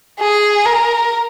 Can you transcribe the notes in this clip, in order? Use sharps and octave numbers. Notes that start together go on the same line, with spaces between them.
G#4
A#4